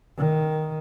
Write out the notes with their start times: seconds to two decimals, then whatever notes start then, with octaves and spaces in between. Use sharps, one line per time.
0.17 D#3